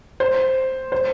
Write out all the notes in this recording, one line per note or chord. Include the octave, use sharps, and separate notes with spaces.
C5
C5